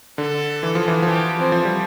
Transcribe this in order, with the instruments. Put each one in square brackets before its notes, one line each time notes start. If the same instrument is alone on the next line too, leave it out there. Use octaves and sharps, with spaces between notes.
[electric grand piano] D3 [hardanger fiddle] A4
[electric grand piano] E3
F3
E3
F3
[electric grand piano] E3 [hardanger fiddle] G4
[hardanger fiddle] C4
[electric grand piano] F3
G3